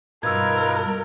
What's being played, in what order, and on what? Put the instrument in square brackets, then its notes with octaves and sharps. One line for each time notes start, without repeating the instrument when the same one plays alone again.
[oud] G2 B2 [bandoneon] D#4 F4 B4 [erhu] A#4 [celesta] E6 G#6